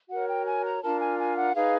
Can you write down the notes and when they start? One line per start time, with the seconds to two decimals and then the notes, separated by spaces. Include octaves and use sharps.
0.10 F#4 A#4 C#5 F#5
0.28 G5
0.46 G#5
0.64 A#5
0.82 D4 F4 A#4 A5
1.01 G#5
1.19 G#5
1.37 F#5
1.55 D#4 G#4 B4 F5